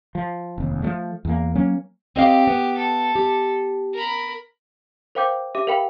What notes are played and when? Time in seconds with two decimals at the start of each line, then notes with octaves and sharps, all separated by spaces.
0.15 F3
0.58 F1 D#2
0.82 F3 G3 A3
1.25 E2 A#3
1.55 F#3 A#3 C#4
2.16 C4 G4 D#5 F5
2.47 B3
2.77 A4
3.15 G4
3.93 A#4 B5
5.15 A#4 C5 F5 G5 D6 G6
5.55 G4 E5 D6
5.67 A#4 B4 F5 G5 B5